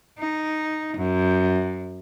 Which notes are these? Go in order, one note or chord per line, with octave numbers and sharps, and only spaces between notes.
D#4
F#2